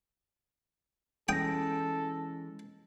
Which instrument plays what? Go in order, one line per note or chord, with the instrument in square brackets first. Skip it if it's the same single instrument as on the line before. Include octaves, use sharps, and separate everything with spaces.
[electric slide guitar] E3 G#3 [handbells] C#4 A#6 [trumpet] A4 [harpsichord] G5 D#6